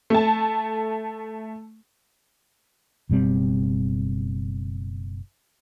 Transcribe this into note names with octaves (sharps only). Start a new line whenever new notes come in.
A3 A5
F#1 B2 G3 C4